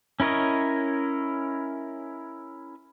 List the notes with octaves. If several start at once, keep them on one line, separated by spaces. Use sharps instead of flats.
C#4 E4 A#4 C#5 D#5